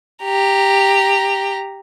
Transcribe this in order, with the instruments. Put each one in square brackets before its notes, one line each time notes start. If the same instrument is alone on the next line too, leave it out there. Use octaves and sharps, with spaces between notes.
[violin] G4 A#5